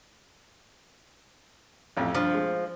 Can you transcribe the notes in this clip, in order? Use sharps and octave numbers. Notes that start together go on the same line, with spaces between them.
A1 F2
G2 F3
G#3